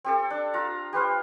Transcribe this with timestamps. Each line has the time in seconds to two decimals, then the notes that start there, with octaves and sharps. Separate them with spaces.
0.04 C4 G4 A4
0.30 D4
0.54 F4 A#5
0.93 G4 B4 C5 F5